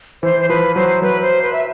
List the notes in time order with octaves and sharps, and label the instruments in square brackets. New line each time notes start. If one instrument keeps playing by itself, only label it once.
[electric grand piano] E3 [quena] C5
[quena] C5
[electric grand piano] F3 [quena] B4
[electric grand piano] F#3 [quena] C5
[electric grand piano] F#3 [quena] B4
[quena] C5
B4
E5